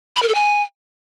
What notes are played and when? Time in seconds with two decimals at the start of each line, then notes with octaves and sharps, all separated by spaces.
0.16 B5
0.23 A#4
0.29 A4
0.35 G#5